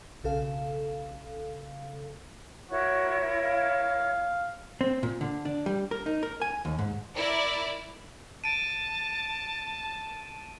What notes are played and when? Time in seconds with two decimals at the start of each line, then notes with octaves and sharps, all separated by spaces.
0.24 B1 C#3 A4 F5
2.71 E4 F#4 A#4 C#5
3.43 F5
4.81 C4
5.03 A#2
5.21 D3
5.45 D4
5.66 G3
5.91 A#4
6.06 D#4
6.23 A#4
6.42 G#5
6.65 D#2
6.79 G#2
7.15 E4 A#4 D5
8.44 A5 D7 D#7